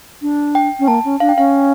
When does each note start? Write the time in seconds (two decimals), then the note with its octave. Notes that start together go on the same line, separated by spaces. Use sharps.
0.22 D4
0.55 G5
0.79 C#4
0.88 A#3 A5
1.05 C#4
1.20 D4 F5
1.29 G5
1.37 C#4 F5